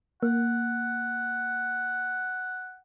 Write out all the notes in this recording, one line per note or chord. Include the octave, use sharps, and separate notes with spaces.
A#3 F#5